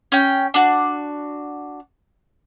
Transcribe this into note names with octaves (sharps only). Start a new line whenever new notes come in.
C#4 G5
D4 F#4